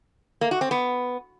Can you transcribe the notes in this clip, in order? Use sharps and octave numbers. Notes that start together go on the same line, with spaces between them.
A#3
F#4
C4
B3